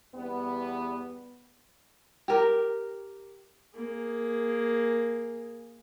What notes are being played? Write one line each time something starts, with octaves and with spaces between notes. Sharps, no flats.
E2 G3 B3
G4 A#4
A#3 G#4